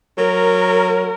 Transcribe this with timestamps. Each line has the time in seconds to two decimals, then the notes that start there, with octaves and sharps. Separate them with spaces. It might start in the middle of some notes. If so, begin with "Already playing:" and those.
0.18 F#3 A#4